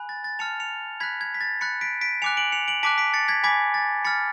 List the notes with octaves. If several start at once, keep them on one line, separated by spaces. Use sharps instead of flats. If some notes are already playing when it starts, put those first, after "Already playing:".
Already playing: G#5 B5 F#6
A6
A6
A5 F6 C#7 F7
C#7 F7
B5 F#6 G#6 B6
G#6
B6
A6
B5 F#6 A6 C#7
B6 D7
B6 D7
G#5 D6 F#6 C#7 F7
D7 F#7
C#7 F7
D7 F#7
A5 D6 F#6 B6 D7
B6 D7
A6 C#7
G#6 B6
G#5 B5 D6 G#6 B6
A6
B5 F6 A6 C#7